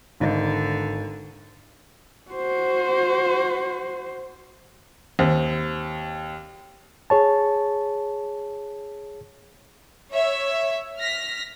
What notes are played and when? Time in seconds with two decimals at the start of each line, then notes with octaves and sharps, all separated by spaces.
0.20 G#1 D3 D#4
2.31 F#4 C5
5.19 D#2 C4
7.10 G#4 C#5 A5
10.12 C#5 E5
10.98 F6 A#6 B6